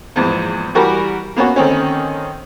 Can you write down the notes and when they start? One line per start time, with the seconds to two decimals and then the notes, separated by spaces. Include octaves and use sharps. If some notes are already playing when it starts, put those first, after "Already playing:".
0.16 A#1 E2 G#2
0.75 E3 G3 F#4 G4 A#4
1.36 A#3 B3 C#4 F#4
1.56 D3 D#3 C4 C#4